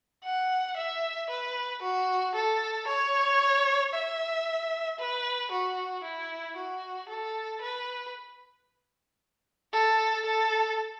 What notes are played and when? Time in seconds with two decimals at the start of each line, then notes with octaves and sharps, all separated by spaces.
0.24 F#5
0.77 E5
1.30 B4
1.82 F#4
2.35 A4
2.88 C#5
3.94 E5
4.99 B4
5.51 F#4
6.04 E4
6.57 F#4
7.09 A4
7.62 B4
9.73 A4
10.25 A4